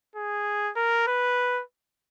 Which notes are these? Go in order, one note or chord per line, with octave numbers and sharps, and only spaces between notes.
G#4
A#4
B4